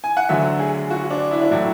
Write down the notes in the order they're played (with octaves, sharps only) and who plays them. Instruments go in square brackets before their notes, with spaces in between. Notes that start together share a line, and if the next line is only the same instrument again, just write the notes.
[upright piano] G#5
F#5
D2 D3 F#3 A3 E5
G#4
F#4
D4
E4
D4
A2 F#3 A3 E4